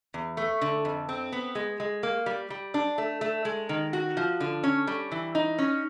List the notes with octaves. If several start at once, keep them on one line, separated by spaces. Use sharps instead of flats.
E2
A3
D3
F2
C4
B3
G#3
G#3
A#3
G3
G3
D4
A3
A3
G#3
D#3
F#4
F3
D3
C#4
G3
E3
D#4
C#4